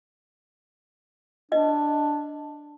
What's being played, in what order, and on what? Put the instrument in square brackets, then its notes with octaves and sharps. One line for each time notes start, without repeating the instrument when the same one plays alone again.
[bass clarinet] D4 [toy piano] B4 D#5